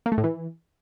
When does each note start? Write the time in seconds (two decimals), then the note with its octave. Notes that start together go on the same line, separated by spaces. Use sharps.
0.06 A#3
0.12 A3
0.18 A2
0.24 E3